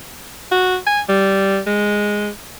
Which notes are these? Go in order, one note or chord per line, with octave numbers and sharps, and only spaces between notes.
F#4
G#5
G3
G#3